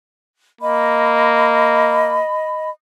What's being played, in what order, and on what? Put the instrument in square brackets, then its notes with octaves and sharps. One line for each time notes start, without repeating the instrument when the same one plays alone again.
[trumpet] A#3 [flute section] D#5 B5